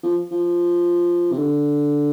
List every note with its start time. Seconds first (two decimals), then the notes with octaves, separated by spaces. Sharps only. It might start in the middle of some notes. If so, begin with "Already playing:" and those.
0.03 F3
0.31 F3
1.31 C3
1.38 D3